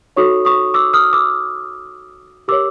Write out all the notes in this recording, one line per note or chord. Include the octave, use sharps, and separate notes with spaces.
D#4 F#4 A4 C#5 C#6 D#6
C#6 D#6
D6 E6
D#6 F6
D6 E6
G4 A#4 C#5 D6 E6